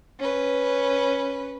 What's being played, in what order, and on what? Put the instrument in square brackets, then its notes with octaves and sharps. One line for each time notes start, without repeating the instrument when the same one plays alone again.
[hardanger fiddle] C#4 B4